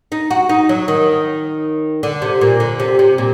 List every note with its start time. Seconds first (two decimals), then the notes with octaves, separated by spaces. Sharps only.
0.12 D#4
0.31 F#4
0.49 D#4
0.69 F#3
0.88 D#3
2.03 D3
2.22 C3
2.41 A#2
2.60 D3
2.80 C3
2.99 C3
3.18 A#2